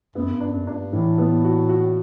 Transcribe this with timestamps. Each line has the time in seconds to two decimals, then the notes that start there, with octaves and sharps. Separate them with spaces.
0.15 F#2 B3
0.32 G2
0.40 D4
0.49 F#2
0.67 G2 D4
0.93 A2 E3
1.18 B3
1.44 F#4
1.69 F#4